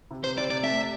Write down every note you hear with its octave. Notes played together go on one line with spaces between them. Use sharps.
C3
C5
C3 D5
D5
A3 E5